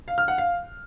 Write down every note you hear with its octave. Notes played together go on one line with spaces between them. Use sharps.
F5
F6
F#5
F5